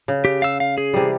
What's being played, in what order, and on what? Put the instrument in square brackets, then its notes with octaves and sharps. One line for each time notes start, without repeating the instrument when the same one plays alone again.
[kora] C#3
[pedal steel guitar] G4
F5 E6
F5
G#4
[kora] C3 E3 G3